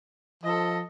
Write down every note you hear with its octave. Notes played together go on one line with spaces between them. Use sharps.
F3 A4 D#5